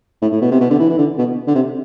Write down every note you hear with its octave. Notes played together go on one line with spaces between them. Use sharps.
A2
A2
B2
C3
B2
D3
E3
E3
D3
B2
D3
C3